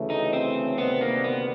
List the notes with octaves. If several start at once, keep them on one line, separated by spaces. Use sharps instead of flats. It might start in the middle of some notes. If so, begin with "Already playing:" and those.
Already playing: D2 C#3 E3 A3
D#4
C4
D2 C3 D#3 G3 B3 C4
A#3
B3